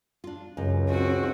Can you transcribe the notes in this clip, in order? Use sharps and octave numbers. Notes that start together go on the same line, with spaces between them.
D4 F4
C#2 F#2
C4 F#4